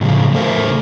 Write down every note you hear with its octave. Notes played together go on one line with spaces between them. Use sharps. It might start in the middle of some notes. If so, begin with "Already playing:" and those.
A2 C#3 E3 F3
C#3 A3 A4 A#4 C5 E5